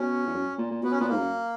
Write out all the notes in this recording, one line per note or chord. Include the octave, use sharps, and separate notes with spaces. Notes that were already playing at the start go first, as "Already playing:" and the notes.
Already playing: B2 C#4
E2
F#2
A#2
A#2
B2 B3
C#4
A#2 B3
G#2 A#3
F#2